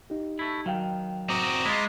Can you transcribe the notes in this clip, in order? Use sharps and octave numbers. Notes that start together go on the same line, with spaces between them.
D#4 G4
A3 E4
D#3 F#3 F5 G5
C4 F#4 A#5 D6 D#6
G#3 E4 F4